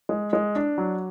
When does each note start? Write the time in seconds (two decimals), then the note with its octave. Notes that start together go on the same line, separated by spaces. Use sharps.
0.09 G#3
0.33 G#3
0.55 D4
0.78 F#3